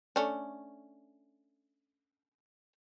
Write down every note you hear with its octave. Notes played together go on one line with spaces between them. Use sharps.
A3 C#4 D4